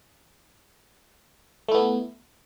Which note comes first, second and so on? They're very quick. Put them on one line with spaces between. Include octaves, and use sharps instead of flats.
A3 E4 B3